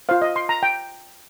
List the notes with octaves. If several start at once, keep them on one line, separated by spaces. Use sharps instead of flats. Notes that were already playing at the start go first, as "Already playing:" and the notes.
F4 C5 F5
D#5
C6
A#5
G5